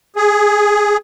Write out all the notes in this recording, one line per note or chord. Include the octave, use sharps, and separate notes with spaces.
G#4